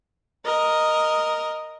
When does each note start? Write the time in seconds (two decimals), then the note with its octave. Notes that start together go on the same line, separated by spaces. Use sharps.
0.46 A#4 D#5